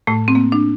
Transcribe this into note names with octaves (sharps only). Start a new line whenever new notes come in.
A2 A3
C4
A#3
D4